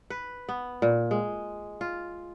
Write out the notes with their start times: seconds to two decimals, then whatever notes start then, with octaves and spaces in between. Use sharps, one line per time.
0.10 B4
0.49 B3
0.82 A#2
1.11 G#3
1.81 F4